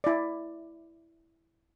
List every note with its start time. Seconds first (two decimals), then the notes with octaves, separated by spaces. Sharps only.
0.04 E4 D5